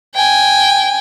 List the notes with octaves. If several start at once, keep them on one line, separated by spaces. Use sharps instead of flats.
G5 G#5